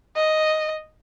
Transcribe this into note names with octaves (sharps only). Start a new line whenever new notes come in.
D#5